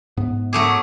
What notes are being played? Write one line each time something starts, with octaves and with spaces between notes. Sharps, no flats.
G#2 B3
F#3 A3 G#4 D6